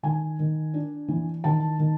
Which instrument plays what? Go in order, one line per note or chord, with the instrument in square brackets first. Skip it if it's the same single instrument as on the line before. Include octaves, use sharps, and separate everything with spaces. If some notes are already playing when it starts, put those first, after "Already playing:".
[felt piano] D#3 G#5
D#3
D4
E3
D#3 A5
D#3